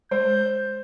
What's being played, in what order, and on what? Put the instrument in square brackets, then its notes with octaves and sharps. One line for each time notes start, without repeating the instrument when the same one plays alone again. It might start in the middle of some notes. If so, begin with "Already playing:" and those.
[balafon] G#3 [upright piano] C5 [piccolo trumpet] G6